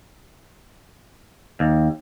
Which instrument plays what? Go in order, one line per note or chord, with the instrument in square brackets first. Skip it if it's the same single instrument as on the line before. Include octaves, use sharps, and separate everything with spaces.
[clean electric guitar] D#2